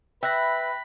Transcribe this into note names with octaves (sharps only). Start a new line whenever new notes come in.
B4 E5 G5 B5 F#6 A#6